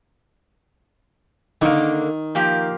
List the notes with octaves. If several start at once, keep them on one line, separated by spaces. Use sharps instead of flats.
D3 D#3 A#3
F3 A#3 G4